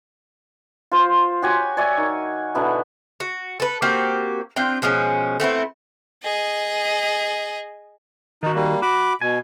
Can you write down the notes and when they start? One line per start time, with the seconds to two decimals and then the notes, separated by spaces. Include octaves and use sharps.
0.91 F4 C5
1.42 F#4 G4 C#5 G#5
1.77 C#5 D5 E5 G#5
1.97 D#3
2.55 B2 D3 E4 B5
3.20 F#4
3.60 A4 B4
3.82 A#3 C4 F#4 G4
4.56 C4 D4 F4 G5
4.82 B2 F3 G#3 C#4
5.40 A3 B3 C4 E4
6.23 G#4 D#5
8.43 D#3 D#4 F#4
8.55 G3 A#3
8.82 F#4 B5 D6
9.21 B2 G#5